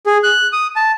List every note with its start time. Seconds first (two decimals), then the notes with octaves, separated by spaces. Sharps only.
0.06 G#4
0.24 F#6
0.53 D#6
0.76 A5